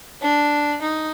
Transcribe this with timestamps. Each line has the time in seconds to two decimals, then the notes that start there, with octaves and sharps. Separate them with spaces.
0.21 D4
0.82 D#4